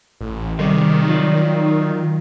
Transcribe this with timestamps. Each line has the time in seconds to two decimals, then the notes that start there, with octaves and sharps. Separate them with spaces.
0.21 A1
0.59 C3 D#3 G3 G#3
1.08 F#3 F4 D5